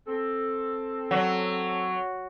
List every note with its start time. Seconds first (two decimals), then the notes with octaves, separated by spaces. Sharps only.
0.07 C4 A4
1.11 F#3